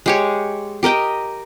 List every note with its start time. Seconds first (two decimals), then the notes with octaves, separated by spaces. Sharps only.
0.06 G#3 G4 C#5
0.83 G4 A#4 D#5 G5